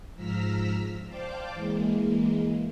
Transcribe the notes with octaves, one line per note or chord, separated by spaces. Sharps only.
G#2 F3 A#5 E6 F6 B6
C5 D5 F5 G5 A5 D6
E3 G#3 A#3